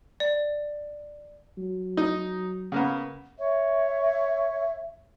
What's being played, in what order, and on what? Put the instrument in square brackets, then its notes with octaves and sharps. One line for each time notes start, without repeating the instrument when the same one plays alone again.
[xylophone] D5
[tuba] F#3
[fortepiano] D#4
C#3 A#3 B3
[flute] C#5 [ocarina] E5